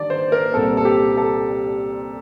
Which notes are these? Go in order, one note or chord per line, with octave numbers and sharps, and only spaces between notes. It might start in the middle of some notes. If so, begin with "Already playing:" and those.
Already playing: D#3 G3 D4 D5
C5
A#4
C2 A#2 G3 C4 A4
A4
G4
A4